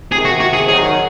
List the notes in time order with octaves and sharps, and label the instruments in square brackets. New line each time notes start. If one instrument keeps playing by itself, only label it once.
[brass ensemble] C3 D#3 [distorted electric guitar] G#4
[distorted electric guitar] F#4
F#4
G#4
[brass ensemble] D#3 F#3 [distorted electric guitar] G#4